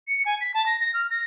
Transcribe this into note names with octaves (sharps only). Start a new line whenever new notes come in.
C#7
G#5
B6
A5
A#6
A#6
F6
A#6